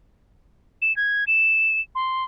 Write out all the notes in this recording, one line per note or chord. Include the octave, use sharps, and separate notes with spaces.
E7
G#6
E7
C6